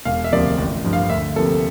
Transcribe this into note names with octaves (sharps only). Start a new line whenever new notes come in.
E1 F5
E5
D2 C3 F3 A#3 D5
A1
G2 F3
F5
D2 E5
C3 F3 A#3 A4